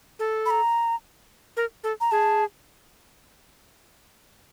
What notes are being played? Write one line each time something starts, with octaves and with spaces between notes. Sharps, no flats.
A4
B5
A#5
A#4
A4
A#5
G#4 A5